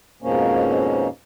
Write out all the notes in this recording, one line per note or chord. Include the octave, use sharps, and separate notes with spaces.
F2 G#2 B2 F3 A#3 C#4